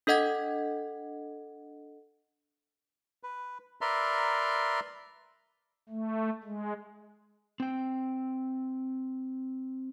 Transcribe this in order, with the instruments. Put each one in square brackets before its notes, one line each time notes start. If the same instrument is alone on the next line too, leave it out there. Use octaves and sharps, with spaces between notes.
[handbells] D4 A4 D#5 F#5 G#6
[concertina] B4
A#4 B4 D5 E5 A#5 C6
[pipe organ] A3
G#3
[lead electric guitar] C4 G5